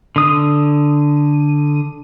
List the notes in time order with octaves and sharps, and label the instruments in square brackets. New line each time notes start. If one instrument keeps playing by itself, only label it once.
[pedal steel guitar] D3 D#6